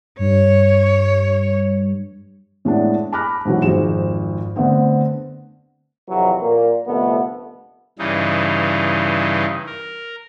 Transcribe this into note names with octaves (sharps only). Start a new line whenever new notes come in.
G2 C#5
A2 G#3 B3 D4
A5 B5 D6 F6 F#6 A#6
G#2 B2 E3 F#3
G#1 F2 G#4 C5 E7
D3 A3 B3 C4
F2 C3 E3 F#3
A#2 A#3
C2 F2 D3 A3 B3
G2 C#3 E3 D#4
A#4